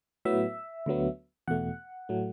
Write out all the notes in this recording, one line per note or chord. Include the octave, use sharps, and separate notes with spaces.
A2 F#3 B3 E5
D2 D3 F#3 B3
E2 B2 A3 F#5
A2 F#3 A3